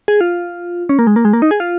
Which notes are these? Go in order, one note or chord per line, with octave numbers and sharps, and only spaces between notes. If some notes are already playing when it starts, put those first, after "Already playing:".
G#4
F4
C#4
A#3
G#3
A#3
G#3
A#3
D#4
G#4
F4